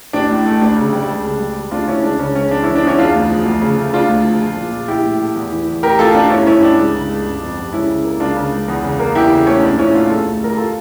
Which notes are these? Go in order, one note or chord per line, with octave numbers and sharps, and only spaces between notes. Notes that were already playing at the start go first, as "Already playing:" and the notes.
A1 D4
A2
A3
D2 D4
C#3
G3
C#2
C#3
G3
E1
D2 D4 F4
E1 C#4 E4
C#2 D4
C#3 C#4
C#2 C#4
E2 D4
E3 C#4 E4
D4
E2 C#4 E4
E1 D4 F4
D2
F3
D2
C#3
A3
E1 D4 F4
D2
F3
A#1
A#2
A#1
A#1 E4 G4
A2
A3
E2
E3
E2
A1 G4 A#4
A2 F4 A4
A3 D4 F4
G1 C#4 E4
G2 C#4 E4
G3 D4
C#2
C#3
C#2
G1
F2
G3
C#2 C#4 E4
C#3
A#3
C#2 D4 F4
C#3
C#2
E2
C#3
A#3
E2 E4 G4
C#3
A3 C#4
A#1 D4
A#2 C#4 E4
A3 D4 F4
E1 F4 A4
D2
G3 A#4
F4 A4